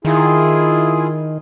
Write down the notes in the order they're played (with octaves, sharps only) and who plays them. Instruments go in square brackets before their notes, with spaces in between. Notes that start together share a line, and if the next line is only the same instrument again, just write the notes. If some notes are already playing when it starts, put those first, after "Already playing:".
[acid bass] D#3 [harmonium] E4 F4 G#4